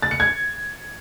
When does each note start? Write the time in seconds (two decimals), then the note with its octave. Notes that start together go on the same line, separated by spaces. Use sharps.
0.02 A6
0.11 C#7
0.20 G#6